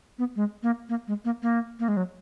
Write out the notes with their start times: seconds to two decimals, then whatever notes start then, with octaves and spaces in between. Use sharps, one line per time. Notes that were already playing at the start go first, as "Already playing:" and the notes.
0.19 B3
0.36 G#3
0.63 A#3
0.89 A#3
1.08 G#3
1.25 A#3
1.43 A#3
1.80 A#3
1.88 G#3
1.97 F#3